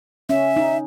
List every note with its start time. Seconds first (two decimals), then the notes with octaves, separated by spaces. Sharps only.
0.29 C#4 E5
0.56 D#4